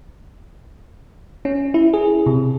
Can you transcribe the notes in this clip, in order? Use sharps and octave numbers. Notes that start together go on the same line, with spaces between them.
C#4
E4
G#4
C3